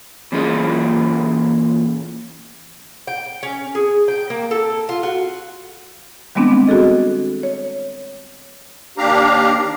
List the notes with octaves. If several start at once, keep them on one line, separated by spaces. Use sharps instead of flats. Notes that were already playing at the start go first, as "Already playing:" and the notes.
A#2 E3 C#4 F4 G#4
G5
C#4
G#4
G5
A#3
A4
F4
F#4
D#3 G3 G#3 B3 C4 D4
F#4 G#4 A4 D#5
C#5
D#2 D4 G4 F5 A#5